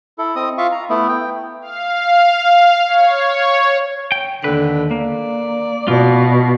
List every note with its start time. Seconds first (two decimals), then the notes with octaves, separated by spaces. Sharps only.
0.18 E4 A4
0.36 C4 D#5 D#6
0.58 F4 E5 F5 C#6
0.72 A#5
0.90 A3 B3 E4
1.09 G5
1.61 F5
2.86 C#5
4.12 G5
4.44 D#2 D3 B4
4.91 A#3 D5
5.88 B2 F4